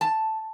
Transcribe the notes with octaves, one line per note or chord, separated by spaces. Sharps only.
A5